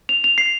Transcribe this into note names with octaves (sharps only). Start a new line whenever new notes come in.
F7
F7
C7